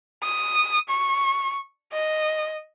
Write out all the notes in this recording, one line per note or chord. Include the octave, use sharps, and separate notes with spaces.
D#6
C#6
D#5